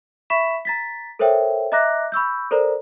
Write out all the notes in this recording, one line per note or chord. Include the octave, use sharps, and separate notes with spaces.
E5 B5 C#6 B6 E7
A#5 A6 B6
A4 A#4 C5 C#5 E5 G5
D#5 E5 A#5 D6 F#6 A#6
B5 C#6 E6 G6
A4 A#4 C5 D5 A#5